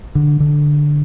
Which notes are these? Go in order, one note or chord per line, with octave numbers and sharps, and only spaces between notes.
D3
D3